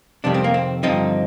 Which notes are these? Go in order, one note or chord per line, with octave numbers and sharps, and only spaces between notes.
F2 C3 D#3 G3 D4
C4
A#3
C4
G2 D3 F3 C4 D#4